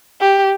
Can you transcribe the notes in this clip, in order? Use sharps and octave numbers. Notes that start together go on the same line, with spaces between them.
G4